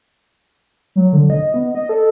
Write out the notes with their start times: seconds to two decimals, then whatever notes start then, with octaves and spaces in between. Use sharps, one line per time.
0.96 F#3
1.13 D3
1.30 D#5
1.54 B3
1.75 D#5
1.89 A4